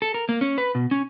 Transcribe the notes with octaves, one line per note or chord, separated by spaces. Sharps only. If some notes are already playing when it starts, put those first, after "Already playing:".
A4
A#4
A#3
C#4
B4
B2
C#4